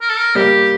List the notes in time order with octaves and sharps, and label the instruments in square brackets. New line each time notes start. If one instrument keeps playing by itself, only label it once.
[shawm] A#4
A4
A#4
[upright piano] G3 A#3 [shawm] G4